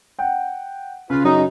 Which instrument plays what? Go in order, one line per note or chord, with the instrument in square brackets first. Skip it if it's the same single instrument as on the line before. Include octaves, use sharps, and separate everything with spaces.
[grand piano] F#5 G5
[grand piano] C#3 [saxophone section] F4 B4
[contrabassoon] F#2 [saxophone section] D#4